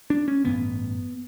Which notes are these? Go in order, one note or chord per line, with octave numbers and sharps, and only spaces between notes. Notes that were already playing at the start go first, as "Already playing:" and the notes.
D4
C#4
A1 G2 D3 B3